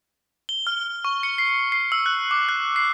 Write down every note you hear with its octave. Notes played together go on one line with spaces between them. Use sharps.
G7
F6
C#6
C#7
C7
C7
E6
F#6
D6
F#6
C7